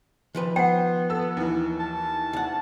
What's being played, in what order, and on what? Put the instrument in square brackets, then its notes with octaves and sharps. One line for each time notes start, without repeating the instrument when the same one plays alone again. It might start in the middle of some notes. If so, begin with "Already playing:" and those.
[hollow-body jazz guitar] D#3 F3 B4
[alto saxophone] B3 [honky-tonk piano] C5 [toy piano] F#5 G5
[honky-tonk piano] A4 E6
D#2 E3
[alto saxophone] A5
[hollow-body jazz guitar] D2 F#5